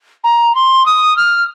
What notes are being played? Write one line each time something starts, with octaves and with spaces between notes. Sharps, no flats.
A#5
C6
D#6
F6